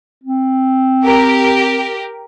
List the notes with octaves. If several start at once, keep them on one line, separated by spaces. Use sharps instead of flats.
C4
G4 A#4